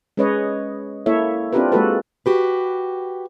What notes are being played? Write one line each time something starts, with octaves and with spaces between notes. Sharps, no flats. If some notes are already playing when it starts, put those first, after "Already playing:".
G#3 C#4 B4 C#5 D#5
A#3 E4 A4 C#5 E5
C4 D4 F4 G4 A#4 B4
G#3 A#3 F#4 A4 B4
F#4 G4 B4